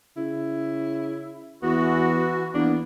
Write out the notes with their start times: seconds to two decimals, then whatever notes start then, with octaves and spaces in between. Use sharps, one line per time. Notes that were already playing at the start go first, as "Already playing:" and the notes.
0.17 C#3 E4
1.63 E2 E3 B3 F#4
2.54 E2 A#3 B3 D4